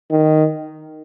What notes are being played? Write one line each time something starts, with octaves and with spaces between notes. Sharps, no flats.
D#3